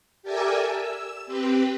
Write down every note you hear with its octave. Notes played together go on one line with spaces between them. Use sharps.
G4 A4 A#4 D5 E5 G#5
E6
C4 G4 B4